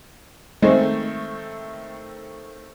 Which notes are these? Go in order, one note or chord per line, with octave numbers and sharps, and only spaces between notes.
D#3 G#3 A3 C4